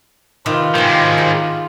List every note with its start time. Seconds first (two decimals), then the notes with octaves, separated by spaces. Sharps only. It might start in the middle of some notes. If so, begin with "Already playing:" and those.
0.46 C3 D#3 F4 B4
0.75 D#3 G#3 C4 G4
1.18 B5